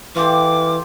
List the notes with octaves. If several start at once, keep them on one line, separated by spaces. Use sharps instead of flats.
E3 F4 G4 A4 D6